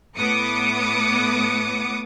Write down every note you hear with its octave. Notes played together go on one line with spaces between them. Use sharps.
A2 B3 D6 D#6 C#7